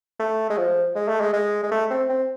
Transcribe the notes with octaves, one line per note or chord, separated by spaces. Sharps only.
A3
G#3
F3
G#3
A3
G#3
G#3
G#3
A3
C4
C4